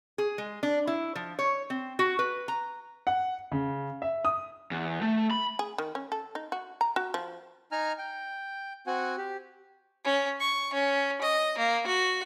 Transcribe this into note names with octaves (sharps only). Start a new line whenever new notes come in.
G#4
G#3
D4
E4
F3
C#5
C4
F#4
B4
A#5
F#5
C#3
E5
D#6
E2
A3
B5
G#4
D#3
C#4
A4
D#4
F#4
A#5
F#4
F3
D#4 G#5 A#5 F6
G5
C4 F#4 F#5 G#5
G4
C#4
C#6
C#4
D#5
A#3
F#4